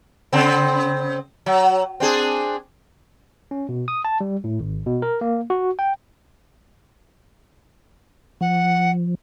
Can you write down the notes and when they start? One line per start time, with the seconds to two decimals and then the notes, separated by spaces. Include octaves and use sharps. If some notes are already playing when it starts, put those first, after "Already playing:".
0.33 C#3 C4
1.46 F#3
2.00 C4 D4 G#4
3.51 C#4
3.69 B2
3.88 D#6
4.05 A5
4.21 G3
4.44 A2
4.60 G#1
4.86 B2
5.02 A#4
5.21 A#3
5.50 F#4
5.79 G5
8.41 F3 F#5